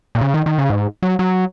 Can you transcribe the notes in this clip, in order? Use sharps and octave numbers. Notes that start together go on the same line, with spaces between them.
A#2
C#3
D#3
D#3
C#3
G#2
F#3
F#3